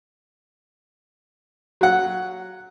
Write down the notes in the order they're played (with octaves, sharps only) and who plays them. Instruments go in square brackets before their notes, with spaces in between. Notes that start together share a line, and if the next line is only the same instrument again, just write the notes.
[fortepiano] F#3 F#5